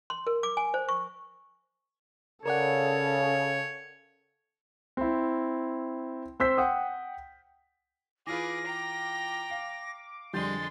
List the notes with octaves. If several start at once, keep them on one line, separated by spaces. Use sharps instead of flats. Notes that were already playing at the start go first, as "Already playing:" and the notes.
C6
A#4
D6
G#5
C5
C#6
C#3 A4 A#4 C#5 D5 F#5
C4 E4
C4 C5 E6 G6 B6
F#5 G5 D#6
E3 F4 G#4 B4 D6 A#6
G5 A#5
F5
F2 D3 G3 G#3 C6 G6 A6